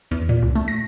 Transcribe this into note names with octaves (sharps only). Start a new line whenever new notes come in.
E2
A#2
C#2
A3
A#6